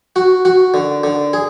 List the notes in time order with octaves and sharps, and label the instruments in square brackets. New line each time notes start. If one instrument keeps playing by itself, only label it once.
[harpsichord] F#4
F#4
D3
D3
G#4